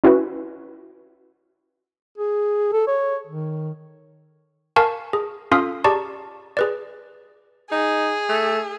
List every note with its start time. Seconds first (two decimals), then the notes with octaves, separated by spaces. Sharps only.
0.04 C#4 E4 F#4 B4
2.18 G#4
2.72 A4
2.87 C#5
3.27 D#3
4.76 A#4 F5 G#5 A5 C#6
5.13 G#4
5.52 C#4 F4 A4 F5 D#6 F6
5.84 G4 G#4 D5 A5 A#5 C#6
6.57 G#4 B4 D5
7.72 D#4 G#4
8.29 A3